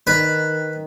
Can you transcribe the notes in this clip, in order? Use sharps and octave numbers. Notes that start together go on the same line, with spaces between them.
D#3 B4